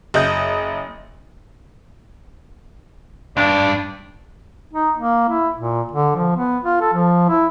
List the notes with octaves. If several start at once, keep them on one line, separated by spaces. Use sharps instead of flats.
F#1 D#5 G6
C#2 G2 D4
D#4
A#3
E4
A#2
D3
F3
B3
F4
A4
F3
E4